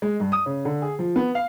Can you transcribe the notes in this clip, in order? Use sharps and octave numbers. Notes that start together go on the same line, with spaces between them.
G#3
G2
D#6
C#3
D3
G#4
F3
B3
F5